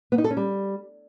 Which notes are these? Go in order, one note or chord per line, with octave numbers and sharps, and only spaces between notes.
B3
D#4
A4
C#4
G3